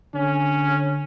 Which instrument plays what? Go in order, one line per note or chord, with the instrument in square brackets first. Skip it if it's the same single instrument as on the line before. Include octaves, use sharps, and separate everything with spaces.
[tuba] D3 [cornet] C#4